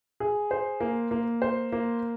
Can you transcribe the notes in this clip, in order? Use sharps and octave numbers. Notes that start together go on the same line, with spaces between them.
G#4
C5
A#3
A#3
C5
A#3